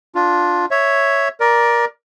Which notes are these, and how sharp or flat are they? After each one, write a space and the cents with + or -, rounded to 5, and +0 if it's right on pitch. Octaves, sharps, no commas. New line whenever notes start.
D4 +0 F4 +10
C#5 +0 E5 +0
A#4 +15 D5 +0